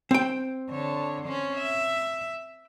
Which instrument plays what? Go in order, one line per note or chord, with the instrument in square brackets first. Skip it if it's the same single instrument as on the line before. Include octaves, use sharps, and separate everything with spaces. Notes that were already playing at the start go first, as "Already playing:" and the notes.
[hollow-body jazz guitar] C4 G5
[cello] D3 C#5
C#4 C5
E5